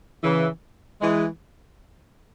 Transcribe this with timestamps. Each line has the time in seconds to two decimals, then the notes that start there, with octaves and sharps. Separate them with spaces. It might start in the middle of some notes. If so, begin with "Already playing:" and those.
0.23 C#3 E3
1.01 E3 G#3